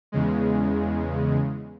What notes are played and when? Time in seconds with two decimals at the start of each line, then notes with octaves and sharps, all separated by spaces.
0.12 E2 C#3 G#3